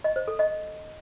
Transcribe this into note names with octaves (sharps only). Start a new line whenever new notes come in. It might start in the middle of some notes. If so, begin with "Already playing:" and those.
D#5
C5
A4
D#5